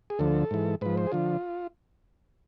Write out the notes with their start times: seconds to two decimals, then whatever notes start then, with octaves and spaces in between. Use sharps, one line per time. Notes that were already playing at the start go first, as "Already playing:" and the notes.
0.10 G#4
0.19 D2 D3 F3 A4
0.51 G#2 E3
0.81 G#2 F3 B4
0.97 C5
1.07 G#4
1.12 D3 F3 F4